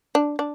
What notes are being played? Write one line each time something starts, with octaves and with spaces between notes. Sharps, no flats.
D4
D4